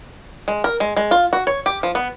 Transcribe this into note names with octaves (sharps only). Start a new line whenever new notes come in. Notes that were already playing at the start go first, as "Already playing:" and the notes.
G#3
A#4
G#3
G#3
F4
F#4
C#5
G4
F3
B3